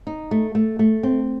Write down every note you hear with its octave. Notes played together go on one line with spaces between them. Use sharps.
D#4
A3
A3
A3
C4